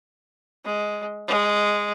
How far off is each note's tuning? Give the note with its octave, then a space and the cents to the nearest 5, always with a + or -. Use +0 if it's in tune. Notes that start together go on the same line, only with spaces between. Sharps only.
G#3 +5
G#3 -5